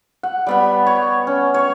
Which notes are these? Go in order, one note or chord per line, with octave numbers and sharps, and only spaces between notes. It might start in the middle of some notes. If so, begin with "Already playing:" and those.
F#5
G3 B3 B5
C#5
C#4
C#5 C#6